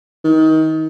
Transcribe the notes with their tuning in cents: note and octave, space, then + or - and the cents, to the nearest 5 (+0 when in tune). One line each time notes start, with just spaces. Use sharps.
D#3 +25